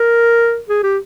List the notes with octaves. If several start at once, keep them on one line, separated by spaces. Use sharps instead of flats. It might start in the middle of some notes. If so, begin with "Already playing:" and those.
Already playing: A#4
G#4
G4